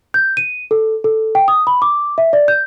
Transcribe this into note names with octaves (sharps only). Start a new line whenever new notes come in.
G6
D#7
A4
A4
G5
D#6
B5
D6
E5
D5
G6